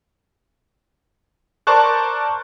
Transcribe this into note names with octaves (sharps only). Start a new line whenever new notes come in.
A#4 C5 D5 A5 C#6 F#6